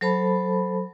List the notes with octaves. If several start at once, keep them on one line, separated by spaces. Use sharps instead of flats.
F#3 A4 C5 A5 B5